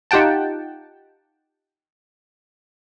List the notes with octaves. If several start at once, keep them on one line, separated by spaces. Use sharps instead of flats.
D#4 F4 G4 F#5 G5 A5